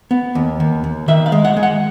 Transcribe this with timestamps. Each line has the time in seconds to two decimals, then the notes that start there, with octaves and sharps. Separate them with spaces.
0.11 B3
0.35 D#2
0.60 D#2
0.84 D#2
1.08 D#3 E5
1.26 F5
1.32 G#3
1.45 F#5
1.57 G#3
1.63 F#5